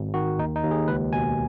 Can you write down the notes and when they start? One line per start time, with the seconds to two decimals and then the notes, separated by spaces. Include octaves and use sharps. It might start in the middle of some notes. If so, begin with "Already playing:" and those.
Already playing: G#1
0.14 D#3 F#4
0.39 D#2 D#4
0.56 D#4
0.64 D#2
0.71 G#4
0.88 C#2 B4
1.13 B2 G#5